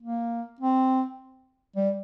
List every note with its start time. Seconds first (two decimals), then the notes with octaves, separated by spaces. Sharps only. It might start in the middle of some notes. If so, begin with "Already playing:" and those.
0.02 A#3
0.61 C4
1.76 G3